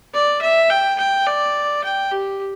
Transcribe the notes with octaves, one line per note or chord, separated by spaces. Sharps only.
D5
E5
G5
G5
D5
G5
G4